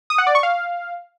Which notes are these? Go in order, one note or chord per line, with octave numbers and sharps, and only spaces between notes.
D#6
F#5
D5
C#6
F5